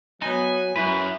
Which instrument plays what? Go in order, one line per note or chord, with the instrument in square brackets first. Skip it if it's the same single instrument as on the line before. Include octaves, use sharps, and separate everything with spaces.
[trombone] F#3 [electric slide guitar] B3 D#4 [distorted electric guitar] G#5
[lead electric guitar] F#2 [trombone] E4 [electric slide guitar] B4